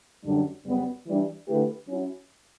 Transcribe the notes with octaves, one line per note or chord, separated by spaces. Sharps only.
F#2 D3 G3 D4
F#2 C#3 G3 B3
E3 G3 D4
D3 A3 E4 G4 B4
F#3 C#4 E4